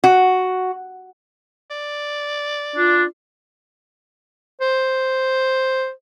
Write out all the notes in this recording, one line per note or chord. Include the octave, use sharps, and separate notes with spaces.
F#4
D5
D4 F4
C5